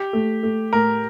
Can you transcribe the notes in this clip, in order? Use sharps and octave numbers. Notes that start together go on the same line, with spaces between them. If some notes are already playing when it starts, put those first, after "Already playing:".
Already playing: G4
A3
A3
A2 A#4